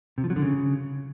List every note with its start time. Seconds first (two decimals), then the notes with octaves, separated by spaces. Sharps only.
0.18 C3
0.24 F3
0.30 F#3
0.36 D3
0.42 C#3